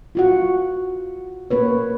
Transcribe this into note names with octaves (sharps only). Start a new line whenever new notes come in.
F4 F#4 F#5
A#3 B3 B4 C#5